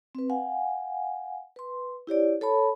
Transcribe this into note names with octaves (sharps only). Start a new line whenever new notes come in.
C4 B4
F5 F#5 G#5
B4 C6
E4 G4 C#5 D5
A4 C#5 A5 B5